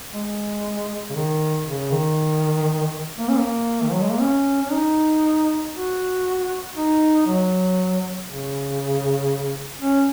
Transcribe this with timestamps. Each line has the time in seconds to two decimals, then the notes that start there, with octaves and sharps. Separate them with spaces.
0.13 G#3
1.10 C#3
1.15 D#3
1.66 C#3
1.92 D#3
3.19 A#3
3.29 C#4
3.37 A#3
3.83 D#3
3.92 F#3
4.01 G#3
4.12 A#3
4.21 C#4
4.62 C#4
4.72 D#4
5.74 F#4
6.75 D#4
7.26 F#3
8.28 C#3
9.81 C#4